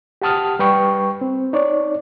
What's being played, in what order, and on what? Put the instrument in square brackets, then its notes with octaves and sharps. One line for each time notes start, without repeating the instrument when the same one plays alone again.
[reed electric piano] G4 F#5 A5 D#6 F6
G3 B4 G5 C#6
C4
D#4 C#5 D5